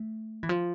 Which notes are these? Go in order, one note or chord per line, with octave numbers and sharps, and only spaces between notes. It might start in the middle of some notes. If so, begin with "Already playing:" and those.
Already playing: A3
E3
F3